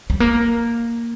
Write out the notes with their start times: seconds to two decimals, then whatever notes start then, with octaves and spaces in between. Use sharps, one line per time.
0.10 G3
0.20 A#3